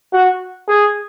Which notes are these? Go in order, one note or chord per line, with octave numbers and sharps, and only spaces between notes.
F#4
G#4